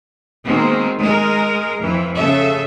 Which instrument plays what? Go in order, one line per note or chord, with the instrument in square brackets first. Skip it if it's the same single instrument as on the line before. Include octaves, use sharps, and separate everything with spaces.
[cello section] B2 D#3 G#3 A#3 C4
G#3 A#4
F2 E3
C#3 A4 E5